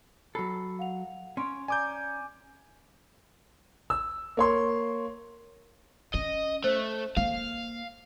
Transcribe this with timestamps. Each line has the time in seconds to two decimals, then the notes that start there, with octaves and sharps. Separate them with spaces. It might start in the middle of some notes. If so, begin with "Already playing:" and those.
0.35 F#3 A4 B5 E6 C7
0.79 F5 F#5 F7
1.37 C#4 C6 C#6 D7
1.68 D5 G#5 A#5 D6 G6
3.90 E6
4.37 A#3 C#5 C6
6.14 C#4 D#5
6.64 A3 C5
7.17 A#3 F5